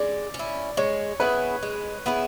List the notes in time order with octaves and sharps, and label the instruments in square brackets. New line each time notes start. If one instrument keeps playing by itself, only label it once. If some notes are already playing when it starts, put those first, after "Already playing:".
Already playing: [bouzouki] G#3 [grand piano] D5
[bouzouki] C#4
E4
[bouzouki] G#3 [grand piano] C#5
[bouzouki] B3 E4 G#4 [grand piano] B4
[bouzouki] G#3
B3 E4 G#4